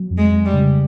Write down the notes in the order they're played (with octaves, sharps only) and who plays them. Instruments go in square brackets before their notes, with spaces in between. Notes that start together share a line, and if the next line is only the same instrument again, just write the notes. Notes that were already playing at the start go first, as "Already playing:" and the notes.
Already playing: [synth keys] F#3
F2
[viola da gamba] G#3
[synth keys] F2
[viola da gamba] G3
[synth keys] C#3